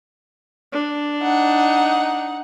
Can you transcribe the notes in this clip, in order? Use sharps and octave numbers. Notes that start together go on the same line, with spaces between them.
D4
D#4 F#5